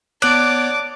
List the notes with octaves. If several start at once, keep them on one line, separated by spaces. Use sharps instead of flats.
B3 C#5 D5 A5 D6 F#6